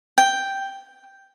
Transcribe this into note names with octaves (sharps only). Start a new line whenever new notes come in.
G5